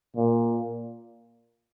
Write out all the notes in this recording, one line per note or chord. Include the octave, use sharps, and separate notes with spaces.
A#2